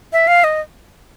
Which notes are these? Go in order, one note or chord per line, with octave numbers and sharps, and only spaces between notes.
E5
F5
D#5